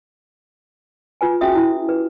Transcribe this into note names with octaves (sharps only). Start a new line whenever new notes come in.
F4 B4 G#5
C#4 F#4 G#4 E5 D#6
E4
B4